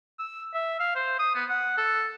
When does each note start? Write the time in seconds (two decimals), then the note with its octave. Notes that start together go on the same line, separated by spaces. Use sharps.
0.19 E6
0.54 E5
0.80 F5
0.95 C5
1.19 D#6
1.35 B3
1.49 F#5
1.78 A4